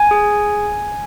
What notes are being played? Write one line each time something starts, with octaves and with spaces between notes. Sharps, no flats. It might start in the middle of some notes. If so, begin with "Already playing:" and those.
Already playing: G#5
G#4